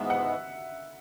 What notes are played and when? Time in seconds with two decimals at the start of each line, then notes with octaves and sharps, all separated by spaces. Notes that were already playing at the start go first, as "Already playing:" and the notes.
Already playing: G#2 E3 G#3 B3 E5
0.10 F#5